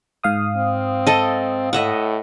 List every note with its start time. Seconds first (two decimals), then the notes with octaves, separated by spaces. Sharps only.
0.24 G#2 F5 D#6
0.56 C4
1.07 A4 D#5
1.73 A2 D#5 E5 F#5